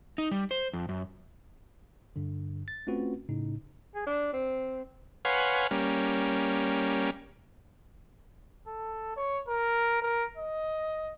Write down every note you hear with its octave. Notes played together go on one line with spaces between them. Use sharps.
D#4
G3
C5
F2
F#2
G2 D3
A6
A3 C4 C#4 F4 F#4 B4
A2 C#3 D#4
G#4
D4
C4
B4 C#5 F5 F#5 G#5 C6
G3 A#3 C#4
A4
C#5
A#4
A#4
D#5